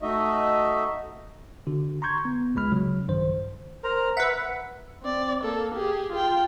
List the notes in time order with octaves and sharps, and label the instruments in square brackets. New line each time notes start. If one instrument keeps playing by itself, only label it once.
[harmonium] A3 D#4 F#4 D#5 E5
[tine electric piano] D3 F#4
A#5 C6 C#6 G6 G#6
B3
G1 C#2 G#3 B5 F6
C#3 F#3
A#1 G2 D#3 C5
[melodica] A#4 C5 A#5
[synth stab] B4 E5 [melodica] F#5
[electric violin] C4 D5
A#3 A4
G4 G#4
F4 G5